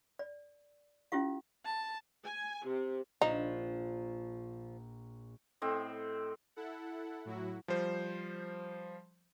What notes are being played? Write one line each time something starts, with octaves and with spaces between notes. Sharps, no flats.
D5
C#4 E4 F4 G4 F5
A5
G#5
C3
A#1 F3 D#4
A2 C4 D#5
E4 A4 F#5
A2 F#3 E4 F#4
F3 G3 C5